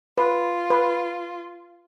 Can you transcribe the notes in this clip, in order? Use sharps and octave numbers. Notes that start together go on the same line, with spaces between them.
F4 B4
B4